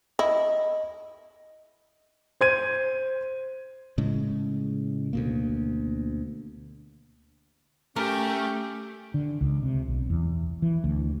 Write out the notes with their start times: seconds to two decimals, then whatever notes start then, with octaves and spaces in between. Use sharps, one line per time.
0.19 E4 D#5
2.41 C5 G#6 D#7
3.98 A2 C#3 G#3
5.13 D2 B2 A#3
7.96 A3 C#4 G4 A#4
9.14 D3
9.41 C#2
9.63 C3
9.88 B1
10.10 E2
10.62 E3
10.84 D2